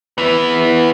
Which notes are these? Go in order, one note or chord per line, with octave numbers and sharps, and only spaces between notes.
E3 B3